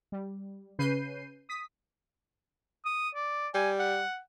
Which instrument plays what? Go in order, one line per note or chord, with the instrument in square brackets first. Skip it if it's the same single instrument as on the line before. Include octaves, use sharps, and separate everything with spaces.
[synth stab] G3
C#3 C#4 B4 G6 C7 D#7
D#6 B6
[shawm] D#6
D5
[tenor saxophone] G3 [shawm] G#5
[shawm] F#5